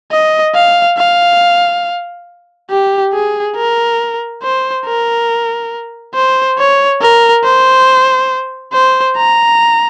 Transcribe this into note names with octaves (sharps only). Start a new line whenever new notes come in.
D#5
F5
F5
G4
G#4
A#4
C5
A#4
C5
C#5
A#4
C5
C5
A#5